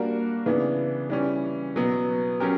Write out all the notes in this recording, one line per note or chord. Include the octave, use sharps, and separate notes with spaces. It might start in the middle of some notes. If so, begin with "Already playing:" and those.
Already playing: G3 A#3 D4 F#4 A#4
C#3 E3 B3 D4
E3 G3 C#4
B2 F#3 B3
F#3 C#4 G4 A#4